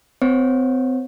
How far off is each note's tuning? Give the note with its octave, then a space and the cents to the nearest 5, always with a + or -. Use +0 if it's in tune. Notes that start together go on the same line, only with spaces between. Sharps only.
C4 -35 C#5 -25